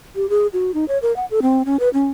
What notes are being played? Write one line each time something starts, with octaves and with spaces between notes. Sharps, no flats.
G4
G#4
F#4
D#4
C#5
A#4
F#5
A4
C4
C#4
B4
C#4